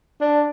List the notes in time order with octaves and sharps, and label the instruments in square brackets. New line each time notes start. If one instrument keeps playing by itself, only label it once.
[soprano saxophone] D4